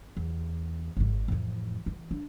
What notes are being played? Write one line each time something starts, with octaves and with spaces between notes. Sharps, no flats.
E2
G#1 G#2
A1 F2
E3
D4